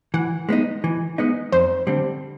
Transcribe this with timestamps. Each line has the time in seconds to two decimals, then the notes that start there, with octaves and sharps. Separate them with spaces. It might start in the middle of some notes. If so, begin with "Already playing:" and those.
0.14 E3 F#5
0.49 G#3 B3 D#4
0.84 E3
1.18 G#3 B3 D#4
1.52 F2 C5
1.87 D3 G3 C4